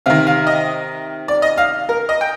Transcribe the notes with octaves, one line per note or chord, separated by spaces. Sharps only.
C3 D#3 F5
F5
D#5
D5
D#5
F5
A#4
D#5
G5